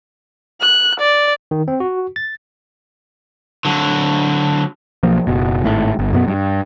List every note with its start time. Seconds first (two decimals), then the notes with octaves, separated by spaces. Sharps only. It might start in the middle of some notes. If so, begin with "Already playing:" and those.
0.61 F#6
1.00 D5
1.51 D#3
1.68 C4
1.80 F#4
2.16 A6
3.65 D3 F#3
5.03 B1 F3 A#3
5.27 F#1 B2
5.64 G#1 A2
5.99 G1
6.13 F#2 B2 B3
6.28 G2